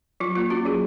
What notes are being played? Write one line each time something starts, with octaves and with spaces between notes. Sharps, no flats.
F#3 F4
A#3 F4
C#4 F#4
F#3 G#4